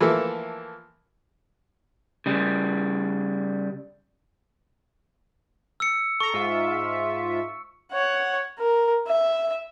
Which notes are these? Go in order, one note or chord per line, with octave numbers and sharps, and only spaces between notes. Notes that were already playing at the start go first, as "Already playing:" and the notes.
E3 F3 A3 A#3 A4 E5
C#3 G3
E6 C#7
A4 A#5 C#6
G#2 F4 E5
C#5 F#5
A#4
E5